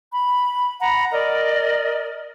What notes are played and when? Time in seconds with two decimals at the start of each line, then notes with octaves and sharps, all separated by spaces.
0.12 B5
0.80 F#5 A#5 B5
1.11 A#4 D5 D#5